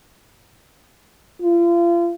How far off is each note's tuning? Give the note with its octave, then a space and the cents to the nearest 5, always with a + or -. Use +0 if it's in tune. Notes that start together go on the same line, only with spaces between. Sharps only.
F4 -35